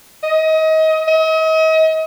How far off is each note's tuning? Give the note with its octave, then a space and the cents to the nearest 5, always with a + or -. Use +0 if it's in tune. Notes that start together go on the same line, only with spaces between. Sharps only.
D#5 +30
D#5 +40